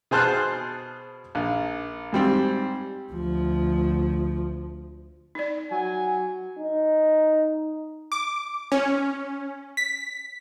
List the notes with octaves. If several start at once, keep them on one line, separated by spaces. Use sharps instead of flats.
B2 G#4 C5 A5 F6 F#6
A#1
G#2 G3 C4
D2 F3
D#4 D5
F#3 G#5
D#4
D6
C#4
B6